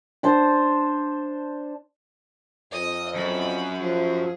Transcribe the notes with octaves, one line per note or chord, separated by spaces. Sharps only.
D4 C5 A5
F2 D#5 D#6
F#2 B5
F3 G#4